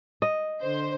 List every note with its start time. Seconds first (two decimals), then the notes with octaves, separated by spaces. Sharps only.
0.22 D#5
0.61 D3 C5